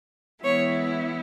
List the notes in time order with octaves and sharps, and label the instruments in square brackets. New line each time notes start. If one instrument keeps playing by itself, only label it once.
[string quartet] E3 G#3 B3 E4 C#5